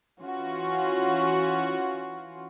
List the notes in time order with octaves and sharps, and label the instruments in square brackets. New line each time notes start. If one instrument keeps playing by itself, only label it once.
[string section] E3 C#4 F4 F#4